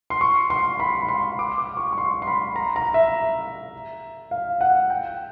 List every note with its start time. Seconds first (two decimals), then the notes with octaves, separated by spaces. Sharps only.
0.10 C6
0.21 C#6
0.50 C6
0.80 B5
1.01 B5
1.09 C6
1.39 D6
1.58 D6
1.77 C#6
1.93 C#6
1.98 C6
2.22 C6
2.27 B5
2.56 A#5
2.76 A#5
2.94 E5
4.31 F5
4.61 F#5
4.90 G5